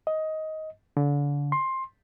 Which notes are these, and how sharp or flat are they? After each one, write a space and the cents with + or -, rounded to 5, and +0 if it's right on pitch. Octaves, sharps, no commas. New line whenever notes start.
D#5 +15
D3 -35
C6 +15